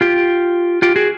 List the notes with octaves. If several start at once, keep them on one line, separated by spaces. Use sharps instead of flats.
F4 G4
F4 G4
F#4 G#4